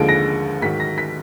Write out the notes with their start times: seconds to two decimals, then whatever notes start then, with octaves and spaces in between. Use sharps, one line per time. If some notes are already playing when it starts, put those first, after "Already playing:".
Already playing: D#2 D3 F3 G#3 D7
0.09 A#6
0.62 G#2 D#3 F#3 B6
0.80 A#6
0.98 B6